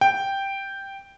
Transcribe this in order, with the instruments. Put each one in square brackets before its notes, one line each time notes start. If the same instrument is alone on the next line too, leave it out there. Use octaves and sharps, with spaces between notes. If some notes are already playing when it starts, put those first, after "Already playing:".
[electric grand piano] G5